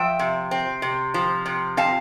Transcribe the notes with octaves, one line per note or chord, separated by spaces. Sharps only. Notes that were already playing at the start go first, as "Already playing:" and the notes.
Already playing: F3 E5 G5
C3
C4
C3
F3
C3
C4 F5 A5